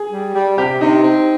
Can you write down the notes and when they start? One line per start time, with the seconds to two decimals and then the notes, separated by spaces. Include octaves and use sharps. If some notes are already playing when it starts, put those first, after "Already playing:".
Already playing: G#4
0.11 G3
0.34 G3
0.57 C3 G4
0.81 C3 D#4
1.04 C4